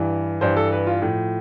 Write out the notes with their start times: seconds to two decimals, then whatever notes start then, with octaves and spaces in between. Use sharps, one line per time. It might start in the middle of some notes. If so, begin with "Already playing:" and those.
Already playing: G2 E3
0.41 G2 E3 C5
0.57 A4
0.72 B4
0.87 F4
1.02 A2 F3